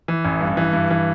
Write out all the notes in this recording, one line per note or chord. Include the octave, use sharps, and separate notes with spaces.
E3
A1
G2
E3
G2
E3